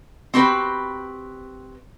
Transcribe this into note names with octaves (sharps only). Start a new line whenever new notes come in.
C4 F#4 G4 B4